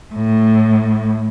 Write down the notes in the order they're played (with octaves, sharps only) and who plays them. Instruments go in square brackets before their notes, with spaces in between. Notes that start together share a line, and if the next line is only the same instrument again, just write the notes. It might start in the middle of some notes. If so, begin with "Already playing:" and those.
[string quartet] A2